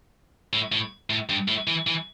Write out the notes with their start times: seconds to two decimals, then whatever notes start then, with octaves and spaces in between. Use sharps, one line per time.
0.53 A2
0.72 A2
1.10 A2
1.29 G2
1.48 A2
1.68 E3
1.87 E3